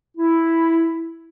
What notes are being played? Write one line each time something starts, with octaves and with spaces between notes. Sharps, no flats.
E4